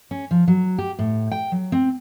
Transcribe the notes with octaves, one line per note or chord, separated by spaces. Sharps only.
C#4
F3
F#3
G4
A2
G5
F#3
C4